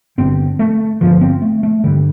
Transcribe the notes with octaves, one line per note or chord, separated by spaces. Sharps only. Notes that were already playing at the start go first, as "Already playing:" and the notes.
G1 G2 D3 C4
A3
G1 G2 D3 F3
C4
A3
A3
G2 D3 G3